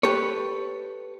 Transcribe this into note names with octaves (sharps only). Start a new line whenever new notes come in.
G4 A4 B4 C#5